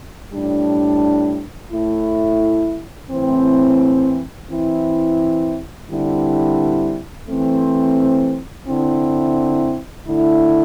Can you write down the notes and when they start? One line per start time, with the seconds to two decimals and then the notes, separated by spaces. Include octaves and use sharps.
0.32 A2 G3 D4
1.71 A2 A3 E4
3.11 A2 E3 C4
4.50 E3 C4 E4
5.90 D3 G3 C4 E4
7.28 E3 A3 C4
8.68 D3 C4 E4
10.07 D3 A3 E4